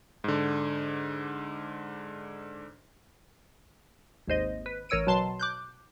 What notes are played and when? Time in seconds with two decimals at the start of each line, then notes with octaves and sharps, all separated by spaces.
0.24 G#2 D3
4.27 G#1 D#2 C5 D#5
4.66 B4
4.89 A1 A#4 C#5 E6 D7 D#7
5.07 B2 F#3 A5 C6 C7
5.40 D6 F#6 G6